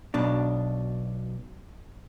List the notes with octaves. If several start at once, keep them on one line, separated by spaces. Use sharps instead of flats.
B1 B2 D4